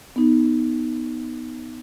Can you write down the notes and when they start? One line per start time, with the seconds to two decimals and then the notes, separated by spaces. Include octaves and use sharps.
0.16 B3 D#4